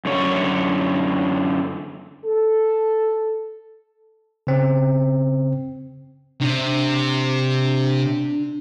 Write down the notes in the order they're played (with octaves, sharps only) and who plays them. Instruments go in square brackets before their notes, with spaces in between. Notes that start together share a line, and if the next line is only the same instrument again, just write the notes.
[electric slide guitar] F#2 D3 C#5
[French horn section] A4
[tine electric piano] C#3 C4
[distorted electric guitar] C3 [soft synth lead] D4